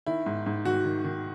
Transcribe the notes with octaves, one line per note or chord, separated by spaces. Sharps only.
D#3 E4
G#2
G#2
D#3 F#4
D#3
D#3